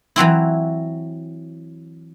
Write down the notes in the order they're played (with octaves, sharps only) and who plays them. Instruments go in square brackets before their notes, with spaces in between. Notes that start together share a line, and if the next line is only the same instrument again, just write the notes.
[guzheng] E3 F#3 C4 E4